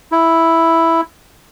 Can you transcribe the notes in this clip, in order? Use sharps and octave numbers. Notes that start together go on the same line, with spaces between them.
E4